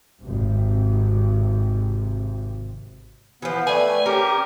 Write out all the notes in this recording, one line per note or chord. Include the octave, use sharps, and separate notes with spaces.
G#1 C3
E3 F3 B3
A3 B4 D5 G#5
C#4 G4 A#4